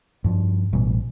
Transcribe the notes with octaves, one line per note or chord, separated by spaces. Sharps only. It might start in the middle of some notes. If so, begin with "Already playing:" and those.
G2 F3
A1 B2 G3